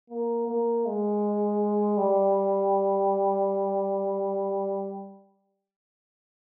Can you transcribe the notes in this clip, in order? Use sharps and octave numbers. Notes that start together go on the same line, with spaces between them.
A#3
A#3
G#3
G3